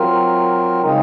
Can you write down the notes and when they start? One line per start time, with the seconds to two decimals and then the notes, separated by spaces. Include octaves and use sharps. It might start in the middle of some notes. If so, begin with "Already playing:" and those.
Already playing: F#3 C4 F4 A#4
0.82 C#3 G#3 C4 D#4